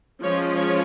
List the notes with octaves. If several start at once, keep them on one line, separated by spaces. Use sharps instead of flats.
F3 G#3 C#4 C#5
C#5